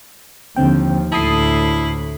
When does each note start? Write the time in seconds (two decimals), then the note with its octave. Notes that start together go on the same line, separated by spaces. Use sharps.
0.56 D#2 D3 F3 C4 G5
1.12 D2 A2 E4 A5 D#6 C7